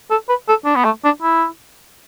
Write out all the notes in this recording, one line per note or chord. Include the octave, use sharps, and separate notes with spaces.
A4
B4
A4
D4
B3
A3
D4
E4